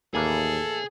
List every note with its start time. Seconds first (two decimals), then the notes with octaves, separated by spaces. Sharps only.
0.14 D#2 A2 E3 A#3 G#4 A4